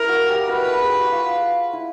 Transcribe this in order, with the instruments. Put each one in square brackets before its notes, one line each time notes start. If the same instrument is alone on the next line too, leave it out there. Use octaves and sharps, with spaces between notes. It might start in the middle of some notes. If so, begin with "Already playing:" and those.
Already playing: [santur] E4 [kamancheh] A#4
[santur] F#4
G4
[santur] F#4 [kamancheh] B4
[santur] A4
G#4
G4
F#4
F4
E4